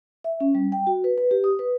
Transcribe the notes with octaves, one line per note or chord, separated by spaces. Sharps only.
E5
C#4
G3
G5
F#4
B4
B4
G4
D#6
B4